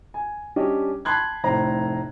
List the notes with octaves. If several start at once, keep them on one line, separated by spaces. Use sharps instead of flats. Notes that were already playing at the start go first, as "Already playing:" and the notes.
G#5
G3 C#4 D4 G4 D#5
G5 A5 B5 C6 F#6 G#6
F1 A2 C5 A#5